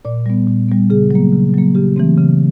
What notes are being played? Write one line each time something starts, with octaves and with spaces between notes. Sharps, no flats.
A#2 D5
G3 B3
A#2
G3 B3
C#3 G#4
F#3 A#3
C#3
F#3 A#3
C#3 G4
E3 A3 C4
C#3